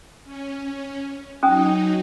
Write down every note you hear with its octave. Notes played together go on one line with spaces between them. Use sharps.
C#4
F#3 C#4 D#4 G#5 D#6